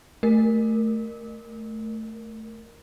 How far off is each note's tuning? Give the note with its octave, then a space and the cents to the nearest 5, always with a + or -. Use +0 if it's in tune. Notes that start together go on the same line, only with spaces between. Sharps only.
A3 +0 A#4 +0